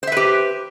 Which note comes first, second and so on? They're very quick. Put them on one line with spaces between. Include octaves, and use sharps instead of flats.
C5 E5 B4 G4